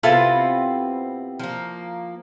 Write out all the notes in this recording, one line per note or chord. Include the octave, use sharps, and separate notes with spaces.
C3 B3 C4 E4 F4 A4
F3 A#3